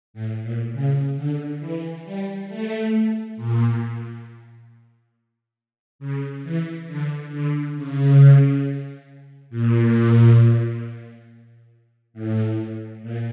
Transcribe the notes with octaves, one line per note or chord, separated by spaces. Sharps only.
A2
A#2
C#3
D3
E3
G3
A3
A#2
C#3
E3
D3
D3
C#3
A#2
A2
A#2